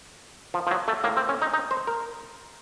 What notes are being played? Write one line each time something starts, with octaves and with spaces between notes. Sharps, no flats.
F3
F3
F#3
A3
A2 A#3
C4
C#4
D#4
D#4
C5
A#4